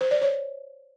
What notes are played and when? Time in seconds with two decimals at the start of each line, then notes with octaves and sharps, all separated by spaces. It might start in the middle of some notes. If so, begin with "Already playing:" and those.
0.01 C5
0.11 D5
0.21 C#5